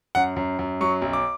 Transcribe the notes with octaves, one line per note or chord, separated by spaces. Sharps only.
F#2 F#5
F#2
F#2
F#3 C#6
B1
D6